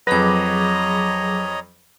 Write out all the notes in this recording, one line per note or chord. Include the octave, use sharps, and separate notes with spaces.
F2 F#3 G#4 B4 C#5 D#5 A#5 D6